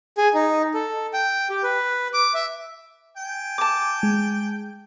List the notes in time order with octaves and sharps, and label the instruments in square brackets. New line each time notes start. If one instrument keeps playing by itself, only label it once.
[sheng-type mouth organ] G#4
D#4
A4
G5
G4
B4
D6
E5
[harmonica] G5 G#5
[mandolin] A5 D6
[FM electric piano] G#3